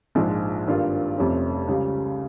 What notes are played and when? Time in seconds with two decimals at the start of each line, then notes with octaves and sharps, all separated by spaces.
0.15 A#1 G#2 F3 G#3
0.66 G#1 G2 G3 A#3 F4
1.18 F1 F2 C3 G3 C#4
1.68 C#2 C#3 G3